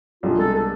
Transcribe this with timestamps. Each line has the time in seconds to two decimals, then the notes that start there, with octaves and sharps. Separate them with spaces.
0.23 C2 B2 G#3 D4 F4 G#4
0.39 A4
0.54 A4